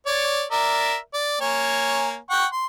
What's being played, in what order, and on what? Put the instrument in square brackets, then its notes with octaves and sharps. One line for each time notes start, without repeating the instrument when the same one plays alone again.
[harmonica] C#5 D5
A#4 D5 E5
D5
A#3 C#5 G#5
F#5 G5 C#6
C6